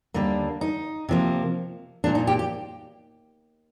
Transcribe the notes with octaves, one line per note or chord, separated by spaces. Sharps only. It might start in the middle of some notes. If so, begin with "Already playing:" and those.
D#2 D3 G3 A#3
D#4
C3 F3 A#3
A#2 F3 A#3 D4
D#4
G4
G4